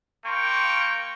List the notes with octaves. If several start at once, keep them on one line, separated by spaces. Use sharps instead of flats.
A#3 G5 C6 C#6